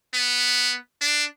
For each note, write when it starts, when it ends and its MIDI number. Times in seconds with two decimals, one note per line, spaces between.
0.14 0.75 59
1.01 1.24 62